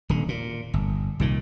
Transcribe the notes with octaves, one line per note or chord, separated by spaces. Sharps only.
D#1 D3
A#2
G1
C2 A#2 D#3